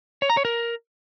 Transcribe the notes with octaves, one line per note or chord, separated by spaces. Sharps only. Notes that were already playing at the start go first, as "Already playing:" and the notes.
C#5
A#5
C#5
A#4